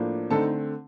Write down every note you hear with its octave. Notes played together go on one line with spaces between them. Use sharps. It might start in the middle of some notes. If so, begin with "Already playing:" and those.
Already playing: A2 F3 A#3 D4
D3 A3 C4 D#4 A4 A5